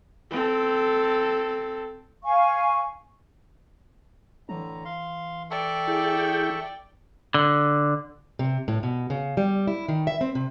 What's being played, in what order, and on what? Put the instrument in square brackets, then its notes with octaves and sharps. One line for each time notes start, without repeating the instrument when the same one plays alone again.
[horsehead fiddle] C4 A4
[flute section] F5 G#5 C#6
[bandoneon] A2 D3 A#5 [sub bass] E3
[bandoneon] F5 C6
[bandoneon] A4 E5 C#6 [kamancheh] D5 G5
[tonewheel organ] E4 G#4 G6
[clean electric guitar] D3
[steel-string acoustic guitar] C3
A2
B2
C#3
G3
E4
D#3
E5
C4
C3